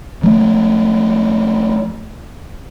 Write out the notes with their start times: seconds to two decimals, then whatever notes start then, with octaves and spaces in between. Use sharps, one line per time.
0.23 F3 A3 A#3